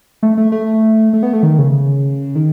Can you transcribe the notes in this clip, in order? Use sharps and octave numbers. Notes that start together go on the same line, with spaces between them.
A3
A3
A3
A3
B3
A3
D#3
C#3
D#3